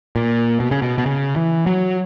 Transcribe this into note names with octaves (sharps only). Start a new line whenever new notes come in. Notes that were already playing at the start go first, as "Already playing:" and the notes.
A#2
B2
C#3
B2
B2
C#3
E3
F#3